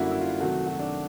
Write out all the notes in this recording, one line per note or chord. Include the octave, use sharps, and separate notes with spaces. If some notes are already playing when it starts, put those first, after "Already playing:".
Already playing: F#2 D3 G3 A#3 E4 F#4
E4
F4
C3 D#3 F#3 A3 F#4
F#4
D4